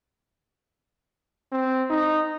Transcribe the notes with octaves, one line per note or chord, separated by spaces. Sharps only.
C4
D#4